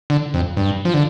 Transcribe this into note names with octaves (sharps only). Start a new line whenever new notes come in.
D3
F2
G2
F3
D3